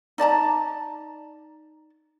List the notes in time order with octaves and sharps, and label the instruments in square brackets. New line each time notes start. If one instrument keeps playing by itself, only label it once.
[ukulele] D#4 D5 A5 A#5